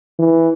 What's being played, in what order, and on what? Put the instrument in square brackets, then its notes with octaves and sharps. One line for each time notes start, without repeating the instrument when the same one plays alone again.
[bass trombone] E3